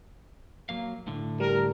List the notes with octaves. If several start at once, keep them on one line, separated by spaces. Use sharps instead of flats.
F#3 A#3 F5
A2 D3
G3 A#4